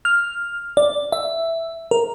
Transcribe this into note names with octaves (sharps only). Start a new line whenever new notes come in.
F6
D5
E5
A#4